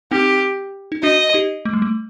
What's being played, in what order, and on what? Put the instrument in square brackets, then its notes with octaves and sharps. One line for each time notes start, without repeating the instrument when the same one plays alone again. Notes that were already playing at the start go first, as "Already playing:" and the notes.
[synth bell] C4 D#4 [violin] G4
[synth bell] D#4
[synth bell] D4 F#4 [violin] D#5
[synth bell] D#4 G4
A3
G3
A3